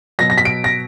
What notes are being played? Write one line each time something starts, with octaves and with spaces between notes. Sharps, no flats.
B2 F#3 A#6
A#6
B6
D7
A#6